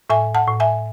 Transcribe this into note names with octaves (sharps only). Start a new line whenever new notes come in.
A2 E5 G#5
F#5 A5
A2
E5 G#5